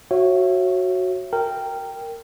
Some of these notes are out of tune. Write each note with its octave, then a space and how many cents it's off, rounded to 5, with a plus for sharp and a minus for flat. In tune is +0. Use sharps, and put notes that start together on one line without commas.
F#4 +0 C#5 -25 E5 +30
A#4 -15 G5 +0